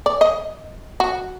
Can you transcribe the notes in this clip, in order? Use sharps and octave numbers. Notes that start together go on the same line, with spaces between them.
D5
D#5
F#4